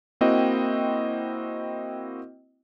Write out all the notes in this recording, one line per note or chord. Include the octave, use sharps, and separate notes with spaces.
A#3 C4 E4 F#4 D#5 G5